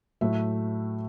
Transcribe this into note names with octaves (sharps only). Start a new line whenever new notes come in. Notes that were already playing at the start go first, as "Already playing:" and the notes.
A2 F#3 A3 E5